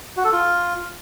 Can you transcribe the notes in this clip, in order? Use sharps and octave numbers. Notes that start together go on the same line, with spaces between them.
F#4
A4
F4